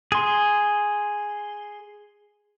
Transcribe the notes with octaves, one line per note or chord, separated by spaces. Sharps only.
G#4 C6